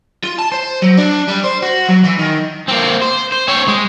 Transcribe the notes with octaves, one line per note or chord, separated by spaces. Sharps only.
F4
A5
C5
F#3
D4
G3
C5
F#4
F#3
E3
D#3
A#3 C4
C5
C5
C4 C#5
G#3